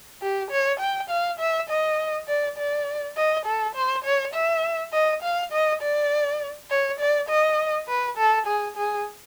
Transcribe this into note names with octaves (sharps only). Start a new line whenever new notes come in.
G4
C#5
G5
F5
E5
D#5
D5
D5
D#5
A4
C5
C#5
E5
D#5
F5
D#5
D5
C#5
D5
D#5
B4
A4
G#4
G#4